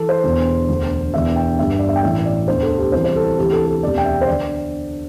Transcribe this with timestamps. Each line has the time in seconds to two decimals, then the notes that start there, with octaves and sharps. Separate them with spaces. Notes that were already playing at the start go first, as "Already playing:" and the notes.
Already playing: E3 A4
0.09 C5
0.24 E1 E2 D3
0.68 E1 D2 D3
1.13 E1 E2 D3 E5
1.36 G5
1.58 G1 G2 D3 E5
1.79 D5
1.89 E5
1.96 G5
2.03 A1 A2 E3 E5
2.25 D5
2.48 E1 D2 D3 C5
2.63 A4
2.78 G4
2.92 C2 C3 E3 C5
3.04 C5
3.16 A4
3.38 D2 C3 E3 G4
3.52 A4
3.67 A4
3.83 E1 D2 C3 D5
3.98 G5
4.05 E5
4.21 C5
4.28 D3 D5